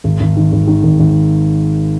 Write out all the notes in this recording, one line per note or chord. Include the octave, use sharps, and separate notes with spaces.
G#1
G#1
D#3
G#1
D#3
G#1
G#1